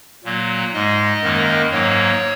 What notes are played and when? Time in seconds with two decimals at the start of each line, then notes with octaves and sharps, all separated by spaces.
0.24 A#2 F#3 A#3
0.74 G#2 G#3 D#5
1.22 F#2 D#3 A#3
1.71 G#2 F#3 A#3 C#5